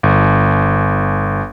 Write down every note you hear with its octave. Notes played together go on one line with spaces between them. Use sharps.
G1